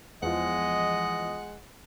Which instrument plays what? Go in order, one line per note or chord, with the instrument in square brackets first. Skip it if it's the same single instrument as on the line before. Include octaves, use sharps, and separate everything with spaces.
[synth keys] E2 F3 [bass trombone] G#3 [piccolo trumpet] D#5 [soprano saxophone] F#5